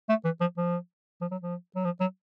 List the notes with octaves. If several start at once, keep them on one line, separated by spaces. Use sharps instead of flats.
A3
E3
F3
F3
F3
F#3
F3
F#3
F3
F#3